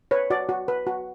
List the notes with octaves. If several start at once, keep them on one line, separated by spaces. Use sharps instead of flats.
B4 C#5
F#4 D5
F#4
B4
F#4